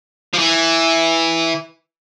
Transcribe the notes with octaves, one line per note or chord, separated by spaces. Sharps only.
F3
E3